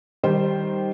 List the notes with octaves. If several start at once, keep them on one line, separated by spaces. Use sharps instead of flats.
D#3 G3 D#4 G4 C5